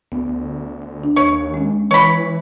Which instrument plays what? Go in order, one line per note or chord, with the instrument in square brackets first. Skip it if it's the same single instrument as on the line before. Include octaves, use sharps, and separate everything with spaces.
[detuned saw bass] D2 [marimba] B3
[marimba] D4
[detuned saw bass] D#2 [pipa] C#5
[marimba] G#3 C#4
[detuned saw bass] E3 [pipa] C#5 B5